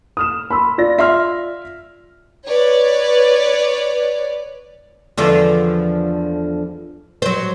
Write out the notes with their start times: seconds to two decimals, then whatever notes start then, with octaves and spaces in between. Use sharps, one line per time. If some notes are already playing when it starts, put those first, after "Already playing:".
0.17 D#6 F6 E7
0.50 B5 C6 E6
0.78 F4 D5 A#6
0.98 E5 C6 F6
2.46 B4 C#5 D5
5.17 E2 D3 F3
7.22 F#3 C5